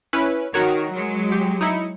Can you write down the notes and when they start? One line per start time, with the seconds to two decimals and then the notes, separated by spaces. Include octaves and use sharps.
0.13 C#4 E4 B4
0.54 D#3 F#4 A#4 C#5
0.92 F#3 G#3
1.32 G4
1.61 D#4 E4 C#7